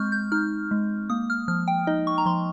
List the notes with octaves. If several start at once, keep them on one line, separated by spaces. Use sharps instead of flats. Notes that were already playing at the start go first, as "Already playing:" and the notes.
Already playing: G#3 C4 C#6 F6 G6
G6
D#4 F6
G#3
A#3 D#6
F6
F3 F6
G5
D#4 D#5
C#6
A#5
F3 C6